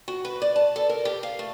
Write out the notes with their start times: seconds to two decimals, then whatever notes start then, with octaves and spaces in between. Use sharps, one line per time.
0.08 F#4
0.25 B4
0.42 D5
0.56 A5
0.76 A4
0.89 A#4
1.05 G4
1.23 F5
1.39 A3